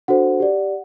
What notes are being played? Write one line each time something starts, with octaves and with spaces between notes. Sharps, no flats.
D4 F#4 A4 C5 F#5
G4 D5